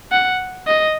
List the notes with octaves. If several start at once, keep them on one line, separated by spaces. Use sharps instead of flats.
F#5
D#5